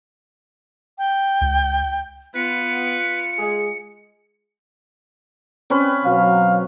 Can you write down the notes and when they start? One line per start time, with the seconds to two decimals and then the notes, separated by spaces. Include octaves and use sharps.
0.98 G5
1.41 C#2
2.36 B3 F4 B4 C#7
3.39 G#3 G#4
5.70 C4 C#4 B4
6.05 B2 F#3 F5